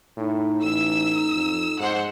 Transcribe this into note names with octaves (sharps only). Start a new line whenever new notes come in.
A2 D#4
A1 E6
F2
G#2 C5 F#5